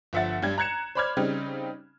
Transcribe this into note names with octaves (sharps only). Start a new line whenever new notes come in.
G1 F3 E5 F#5 A6
G2 G3 G#6
A#5 F#6 G#6 C#7 E7
C5 D5 B5 D6 F6 G#6
C#3 G3 C4 D#4